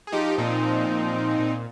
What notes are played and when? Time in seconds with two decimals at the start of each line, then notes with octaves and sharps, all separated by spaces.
0.07 G#4
0.12 F3 D#4 G4
0.38 A#2 C4 D#4
0.63 F3
0.89 A#2
1.14 F3
1.39 A#2